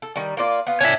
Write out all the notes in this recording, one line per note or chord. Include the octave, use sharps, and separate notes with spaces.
A4
D#3 G3
A#3 F4 D5
B3 F4
C#4 D4 C#5 E5